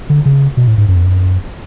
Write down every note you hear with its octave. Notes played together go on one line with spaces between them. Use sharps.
D3
C#3
B2
A2
G#2
F#2
F2
F#2